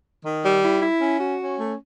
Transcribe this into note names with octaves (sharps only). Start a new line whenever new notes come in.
D#3
G3
E4
E4
C#4
F#4
C#4
A3